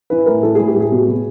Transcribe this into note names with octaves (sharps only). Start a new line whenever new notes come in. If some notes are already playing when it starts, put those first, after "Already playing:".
E3 B4
A2 A#4
E3 A4
A2 G#4
G4
A2 G#4
B2
B2